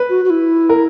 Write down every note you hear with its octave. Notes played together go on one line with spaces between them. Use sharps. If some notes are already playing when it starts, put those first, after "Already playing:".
Already playing: B4
F#4
F#4
E4
A#4